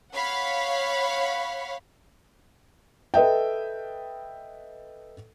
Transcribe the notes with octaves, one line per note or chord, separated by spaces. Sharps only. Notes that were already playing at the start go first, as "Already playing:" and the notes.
C#5 F5 F#5 B5
A4 B4 D#5 E5 G5